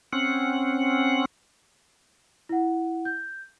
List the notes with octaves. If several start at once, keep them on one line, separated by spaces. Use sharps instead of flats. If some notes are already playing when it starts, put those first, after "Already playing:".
C4 C#4 F#5
E4 F#5
G6